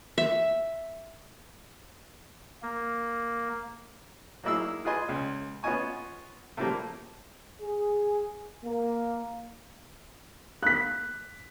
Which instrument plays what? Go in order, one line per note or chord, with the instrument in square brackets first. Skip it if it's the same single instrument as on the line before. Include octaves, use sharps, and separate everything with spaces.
[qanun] E5
[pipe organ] A#3
[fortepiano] F#3 A#3 D#4 E4 G#4 E6
F4 G#4 B4 D#5 G#5 C6
C#2
B3 C#4 F4 D#5 G#5 C#6
A2 C#3 F3 G3 A#3
[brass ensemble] G#4
A#3
[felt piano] F#6 B6